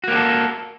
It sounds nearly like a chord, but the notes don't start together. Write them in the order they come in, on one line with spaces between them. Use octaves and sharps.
F#4 A#3 G4 A4